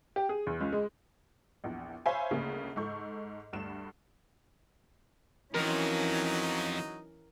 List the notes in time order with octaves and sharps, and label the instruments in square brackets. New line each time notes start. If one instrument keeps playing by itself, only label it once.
[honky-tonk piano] G4
G#4
E2
C#2
G#3
A#1 E2
C5 C#5 E5 F5 G#5 B5
G1 D2 C#3 A#3
G#2 A4 C#6 G6
D2 G2 E7
[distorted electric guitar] F2 [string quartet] E3 C#4 [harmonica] F#3 D#4 [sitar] A#4